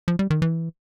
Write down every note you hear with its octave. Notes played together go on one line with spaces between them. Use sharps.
F3
G3
D#3
E3